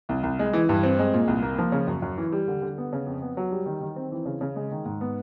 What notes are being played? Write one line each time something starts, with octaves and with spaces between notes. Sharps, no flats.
C2
C2
G#3
E3
G2
C4
G#3
A#2
C2
A#3
F3
C#3
F#2
F#2
E3
G3
D3
D3
B3
C#3
F2
B3
F#3
G3
D#3
D#3
C4
E3
C#3
C#3
G#3
D#3
G#2
B3